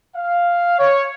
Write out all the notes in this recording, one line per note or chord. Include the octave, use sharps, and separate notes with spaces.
F5
C#5